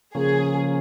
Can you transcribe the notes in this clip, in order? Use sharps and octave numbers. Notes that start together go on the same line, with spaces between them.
C#3 F3 A#3 C#4 G#4